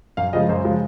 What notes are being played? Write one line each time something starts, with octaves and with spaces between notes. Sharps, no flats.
F#2 F5
C#3 F3 G#3 D#5
F#2 C5
C#3 F3 G#3